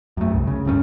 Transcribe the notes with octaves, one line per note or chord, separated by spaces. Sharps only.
F#2 A3
C2
C#3
D1 G2 C4 C#4